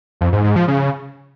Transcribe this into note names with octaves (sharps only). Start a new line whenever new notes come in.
F2
G#2
G#2
F3
C#3